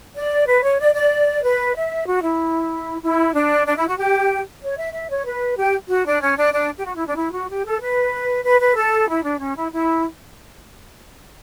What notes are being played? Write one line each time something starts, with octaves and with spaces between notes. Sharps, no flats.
D5
B4
C#5
D5
D5
B4
E5
F#4
E4
E4
D4
D4
E4
F#4
G4
C#5
E5
E5
C#5
B4
G4
F#4
D4
C#4
D4
D4
G4
F#4
E4
D4
E4
F#4
G4
A4
B4
B4
B4
A4
E4
D4
C#4
E4
E4